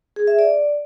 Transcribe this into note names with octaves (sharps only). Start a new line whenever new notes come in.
G#4
E5
D5